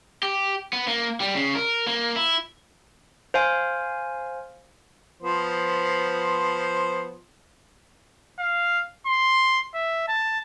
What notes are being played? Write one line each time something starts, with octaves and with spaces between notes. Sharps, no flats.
G4
B3
A#3
G3
C#3
A#4
A#3
E4
C5 F5 G#5
F3 B3 C5
F5
C6
E5
A5